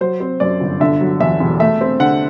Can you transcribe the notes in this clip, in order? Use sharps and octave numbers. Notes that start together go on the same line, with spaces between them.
F#3 C5
C4
F#2 D5
G1
D3 E5
F#3
E2 E5
E1
A3 E5
C4
D3 F#5